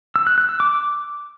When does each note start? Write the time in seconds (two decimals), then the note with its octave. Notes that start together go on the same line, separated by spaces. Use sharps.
0.16 E6
0.27 F#6
0.38 F#6
0.49 E6
0.60 D6